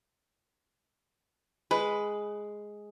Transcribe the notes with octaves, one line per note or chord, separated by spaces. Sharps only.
G#3 B4